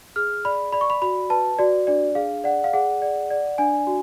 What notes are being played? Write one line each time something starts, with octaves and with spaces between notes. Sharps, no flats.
G#4 F6
D5 B5
D5 B5
C#6
B5
F#4 B5
B4 A5
F#4 D5
D4 D5
G#4 F5
D5 F#5
F5
G#4 F#5
D5
D5
D4 G#5
F#4